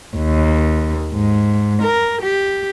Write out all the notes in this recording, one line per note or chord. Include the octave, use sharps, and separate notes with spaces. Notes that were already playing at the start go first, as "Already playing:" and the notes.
D#2
G#2
A#4
G4